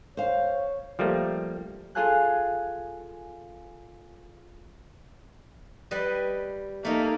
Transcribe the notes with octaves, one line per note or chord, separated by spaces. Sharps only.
C5 C#5 F5
F3 G3 A3 A#3
F4 G#4 A4 F5 G#5 F#6
G3 B4 D#5
A3 A#3 D#4